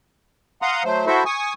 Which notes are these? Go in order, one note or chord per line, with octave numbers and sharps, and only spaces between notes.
F5 F#5 A#5 C6 D#6
F#3 A3 C5
E4 F#4 A4 C5 E5
G#5 C#6 D#6